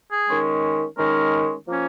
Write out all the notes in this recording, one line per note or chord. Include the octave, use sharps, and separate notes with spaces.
G#4
D#3 G#3 C#4
D#3 G#3 C#4 A#4
F3 A#3 C#4